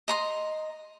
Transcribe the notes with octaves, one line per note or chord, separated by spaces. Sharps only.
D#5 A#5 C6